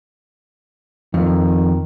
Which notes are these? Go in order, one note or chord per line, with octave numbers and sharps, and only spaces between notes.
F2 D#3